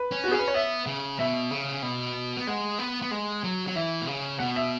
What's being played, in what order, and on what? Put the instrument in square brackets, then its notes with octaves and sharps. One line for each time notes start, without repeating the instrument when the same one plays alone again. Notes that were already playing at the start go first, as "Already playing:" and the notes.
Already playing: [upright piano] B4
[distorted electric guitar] C#4
[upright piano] F#4
[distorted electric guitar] B3
[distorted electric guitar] C#4 [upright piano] G#4
[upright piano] B4
C#5
[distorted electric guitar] B3 [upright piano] E5
[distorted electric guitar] C#3
[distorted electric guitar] B2 [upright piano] E5
[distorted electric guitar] C#3
B2
B3
[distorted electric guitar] G#3 [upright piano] F#5
[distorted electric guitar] B3
B3
G#3
F#3
F#3
[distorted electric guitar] E3 [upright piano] E5
[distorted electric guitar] B2
C#3
[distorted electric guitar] B2 [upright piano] F#5
[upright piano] E5